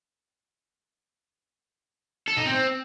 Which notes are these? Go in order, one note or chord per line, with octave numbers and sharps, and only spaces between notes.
A4
D#4
C4